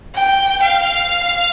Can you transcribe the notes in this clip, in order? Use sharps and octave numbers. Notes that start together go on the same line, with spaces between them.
G5
F5